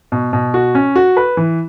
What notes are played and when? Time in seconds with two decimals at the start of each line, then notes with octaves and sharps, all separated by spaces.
0.12 B2
0.33 B2
0.54 F#4
0.75 C#4
0.96 F#4
1.17 B4
1.37 E3